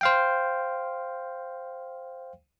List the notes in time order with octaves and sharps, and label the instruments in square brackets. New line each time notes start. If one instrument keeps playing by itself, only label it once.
[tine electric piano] C5 F5 G5